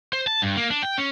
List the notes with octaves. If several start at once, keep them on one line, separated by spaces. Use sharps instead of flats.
C5
A5
G2
A#3
D4
G5
C#4